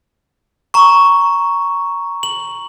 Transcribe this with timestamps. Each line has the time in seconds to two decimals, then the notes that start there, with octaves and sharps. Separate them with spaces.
0.74 A#5 C#6
2.23 F#7